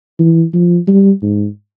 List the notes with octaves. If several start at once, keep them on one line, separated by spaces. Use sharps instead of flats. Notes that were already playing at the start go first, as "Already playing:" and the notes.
E3
F3
G3
G#2